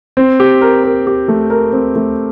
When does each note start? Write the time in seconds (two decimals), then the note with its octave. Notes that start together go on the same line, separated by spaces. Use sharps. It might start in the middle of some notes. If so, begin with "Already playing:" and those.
0.17 C4
0.40 G4
0.61 A#4
0.83 A#4
1.07 G4
1.28 A3
1.50 A#4
1.72 C4
1.96 A3